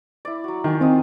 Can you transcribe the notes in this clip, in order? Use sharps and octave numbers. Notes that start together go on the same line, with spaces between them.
E4 D5
F#3 F#4
D#3 G5 G#5
C4 F4 D#5